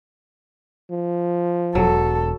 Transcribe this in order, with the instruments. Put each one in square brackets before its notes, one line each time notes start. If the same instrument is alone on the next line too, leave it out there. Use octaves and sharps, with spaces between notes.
[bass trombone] F3
[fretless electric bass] E1 [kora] F#3 [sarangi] A4